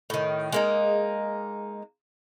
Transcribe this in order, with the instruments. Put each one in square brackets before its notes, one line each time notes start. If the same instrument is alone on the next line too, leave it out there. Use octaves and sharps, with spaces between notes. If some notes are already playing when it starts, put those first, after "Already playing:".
[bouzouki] A2 D#3
G#3 A#3 D#4